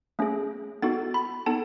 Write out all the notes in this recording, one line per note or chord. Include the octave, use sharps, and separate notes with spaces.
A3 C#4 G#4
B3 D#4 F#4 A4 A6
B5
B3 D#4 A4 A5